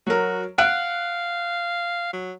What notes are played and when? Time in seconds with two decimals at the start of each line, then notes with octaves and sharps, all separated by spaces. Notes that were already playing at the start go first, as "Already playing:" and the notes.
0.07 F#3 F#4 A#4
0.58 F5 F#5 F#6 D7
2.13 F#3